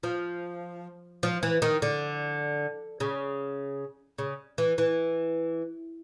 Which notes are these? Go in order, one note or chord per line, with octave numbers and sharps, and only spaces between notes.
F3
F3
E3
D#3
D3
C#3
C#3
E3
E3